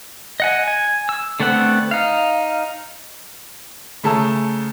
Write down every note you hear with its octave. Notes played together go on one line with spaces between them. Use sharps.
D#5 F#5 G#5
G#5
E6
D3 A3 B3 C4 F#5
D#4 F5
C#3 A3 G#4 A5 A#5 E6